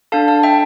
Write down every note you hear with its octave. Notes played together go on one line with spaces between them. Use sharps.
D4 A4 F5 A5
F5 A5
E5 G5